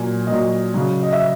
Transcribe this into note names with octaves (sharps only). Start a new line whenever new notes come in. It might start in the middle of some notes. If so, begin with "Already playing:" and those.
Already playing: A#2 F#3 G#5
A#2 F#3 D#5
C#3 F#3
D#5
E5